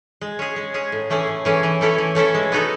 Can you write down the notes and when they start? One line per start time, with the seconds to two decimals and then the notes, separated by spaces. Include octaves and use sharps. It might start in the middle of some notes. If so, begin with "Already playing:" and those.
0.21 G#3
0.39 C#4 G#4
0.56 G#3
0.74 C#4 G#4
0.92 A2
1.10 E3 A3 C#4 G#4
1.27 A2
1.45 E3 A3 C#4 G#4
1.63 E3
1.81 A3 C#4 E4 A4
1.98 E3
2.15 A3 C#4 E4 A4
2.35 G#3
2.52 B3 D#4 F#4 A4